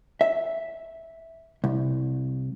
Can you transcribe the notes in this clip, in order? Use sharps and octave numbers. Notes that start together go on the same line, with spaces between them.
E5
C2